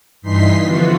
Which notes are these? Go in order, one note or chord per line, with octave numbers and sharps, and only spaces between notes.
G2 E3 D#4 C6 B6 C7
D3 E3 F3 B3 F4 F#4